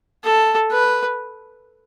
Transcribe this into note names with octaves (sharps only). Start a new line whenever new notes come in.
A4
B4